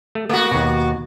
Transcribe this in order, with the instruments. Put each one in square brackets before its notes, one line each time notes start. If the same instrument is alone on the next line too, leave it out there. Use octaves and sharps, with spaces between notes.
[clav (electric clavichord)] A3
[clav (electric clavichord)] A3 [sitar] A#3 F#4
[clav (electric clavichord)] D#2 B2